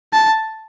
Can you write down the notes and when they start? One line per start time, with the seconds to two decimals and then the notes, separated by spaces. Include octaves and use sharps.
0.13 A5